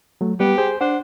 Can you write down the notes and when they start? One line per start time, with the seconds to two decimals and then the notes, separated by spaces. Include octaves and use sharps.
0.21 F#3 A3
0.40 G3 B3 G4
0.58 G#4 C5
0.81 D4 C5 F#5